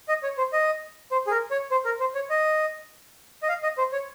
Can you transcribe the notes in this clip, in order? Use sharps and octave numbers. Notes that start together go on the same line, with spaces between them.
D#5
C#5
C5
D#5
C5
G#4
A#4
C#5
C5
A#4
C5
C#5
D#5
D#5
F5
D#5
C5
C#5